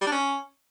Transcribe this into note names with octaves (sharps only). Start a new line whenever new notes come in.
G3
D4
C#4